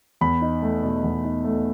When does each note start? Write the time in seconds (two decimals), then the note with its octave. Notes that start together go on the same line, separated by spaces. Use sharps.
0.21 E2 B5
0.41 D#4
0.62 A3
0.83 B2
1.04 E2
1.24 D#4
1.45 A3